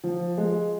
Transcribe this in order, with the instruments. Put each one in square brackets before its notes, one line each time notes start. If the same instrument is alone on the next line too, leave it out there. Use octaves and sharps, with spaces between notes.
[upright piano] F3
G#3